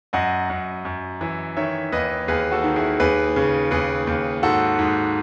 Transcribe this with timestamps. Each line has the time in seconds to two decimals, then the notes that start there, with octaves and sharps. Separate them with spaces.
0.13 F#2 D#5 F#5
0.50 F#2
0.85 F#2
1.21 E3
1.57 D#3 C#5 E5
1.92 D#2 B4 D#5
2.28 D#2 G#4 B4
2.52 F#4 A4
2.64 D#3
2.76 E4 G#4
3.00 D#2 G#4 B4
3.36 C#3
3.71 D#2 G#4 B4
4.07 D#2
4.43 G#2 F#4 A4
4.79 G#2